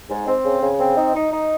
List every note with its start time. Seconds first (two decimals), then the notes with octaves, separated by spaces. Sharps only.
0.10 G#2
0.27 C4
0.44 C#3
0.61 C#3
0.78 C4
0.96 D#4
1.14 D#4
1.32 D#4